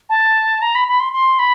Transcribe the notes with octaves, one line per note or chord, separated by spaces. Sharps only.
A5
A#5
B5
B5
C6
C6
B5